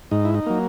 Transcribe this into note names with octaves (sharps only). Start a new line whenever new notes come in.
G#2 D#4
E4
D#4
F#3 A#3